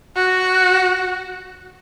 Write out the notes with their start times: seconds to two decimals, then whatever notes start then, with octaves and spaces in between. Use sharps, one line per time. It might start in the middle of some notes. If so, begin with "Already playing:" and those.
0.16 F#4